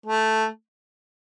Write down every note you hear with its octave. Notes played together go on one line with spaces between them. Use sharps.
A3